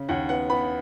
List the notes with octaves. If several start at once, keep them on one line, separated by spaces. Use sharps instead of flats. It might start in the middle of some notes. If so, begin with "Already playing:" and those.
Already playing: C#3
D#2 F#5
B3 F#5
B3 B5